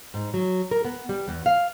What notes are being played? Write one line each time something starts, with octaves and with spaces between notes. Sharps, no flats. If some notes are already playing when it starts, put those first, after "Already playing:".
G#2
F#3
A#4
B3
G3
E2
F5